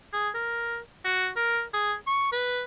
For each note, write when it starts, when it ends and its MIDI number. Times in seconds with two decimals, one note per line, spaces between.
0.13 0.30 68
0.35 0.78 70
1.05 1.29 66
1.36 1.62 70
1.74 1.95 68
2.07 2.30 85
2.32 2.64 71